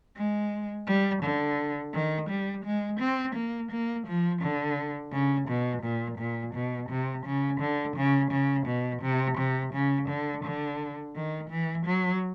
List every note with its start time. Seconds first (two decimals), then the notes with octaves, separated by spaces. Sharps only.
0.17 G#3
0.87 G3
1.23 D3
1.93 D#3
2.29 G3
2.65 G#3
3.00 C4
3.35 A#3
3.71 A#3
4.07 F3
4.41 D3
5.13 C#3
5.48 B2
5.83 A#2
6.18 A#2
6.54 B2
6.89 C3
7.25 C#3
7.60 D3
7.97 C#3
8.31 C#3
8.67 B2
9.02 C3
9.38 C3
9.73 C#3
10.09 D3
10.44 D3
11.15 D#3
11.50 E3
11.86 F#3